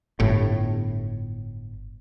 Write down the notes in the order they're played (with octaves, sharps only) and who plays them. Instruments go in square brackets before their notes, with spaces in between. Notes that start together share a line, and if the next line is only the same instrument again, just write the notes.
[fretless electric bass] G1 A2